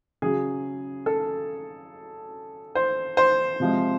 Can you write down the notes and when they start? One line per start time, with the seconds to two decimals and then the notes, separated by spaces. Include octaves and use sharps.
0.22 C#3 F#3 G#4
1.06 A4
2.75 C5
3.17 C5
3.60 C3 F3 G#3